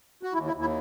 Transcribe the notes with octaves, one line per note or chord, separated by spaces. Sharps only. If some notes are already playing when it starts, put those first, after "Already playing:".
F#4
D#2 E4
E4
D#2
E4